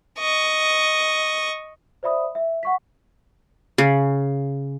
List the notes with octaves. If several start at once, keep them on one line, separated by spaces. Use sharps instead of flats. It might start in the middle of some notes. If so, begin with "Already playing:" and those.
D#5 C#6
C5 D5 E5 B5 D#6
E5
F#5 C#6 B6
C#3